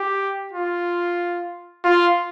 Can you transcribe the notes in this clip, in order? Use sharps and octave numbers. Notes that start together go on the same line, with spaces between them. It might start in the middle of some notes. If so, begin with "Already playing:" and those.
Already playing: G4
F4
F4